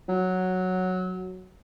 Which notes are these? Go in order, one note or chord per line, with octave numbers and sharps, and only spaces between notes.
F#3